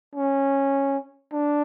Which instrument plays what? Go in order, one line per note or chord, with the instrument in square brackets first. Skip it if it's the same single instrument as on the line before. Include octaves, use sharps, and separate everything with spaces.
[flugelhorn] C#4
D4